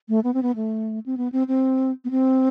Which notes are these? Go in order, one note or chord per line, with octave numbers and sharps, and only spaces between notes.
A3
B3
C4
B3
A3
C4
B3
C4
C4
B3
C4